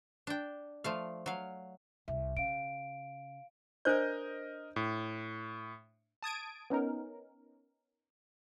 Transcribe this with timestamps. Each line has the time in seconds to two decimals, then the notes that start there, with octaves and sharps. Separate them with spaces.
0.27 D4 G5
0.84 F3 A3 F5
1.26 F#3 F5
2.08 C2 E5
2.37 C#3 F5 D7
3.85 D4 A#4 C5 D5 D#5 G6
4.76 A2
6.23 A5 D#6 G#6 D7
6.70 B3 C#4 D#4 A#4